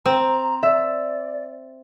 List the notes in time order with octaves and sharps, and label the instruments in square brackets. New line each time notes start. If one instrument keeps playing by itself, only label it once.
[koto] C4 [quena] A#5
[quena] D5 [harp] E5